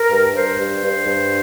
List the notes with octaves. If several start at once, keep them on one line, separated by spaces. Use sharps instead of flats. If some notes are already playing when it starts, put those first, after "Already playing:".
Already playing: A#4
G2
G2 C5
G2
G2
G2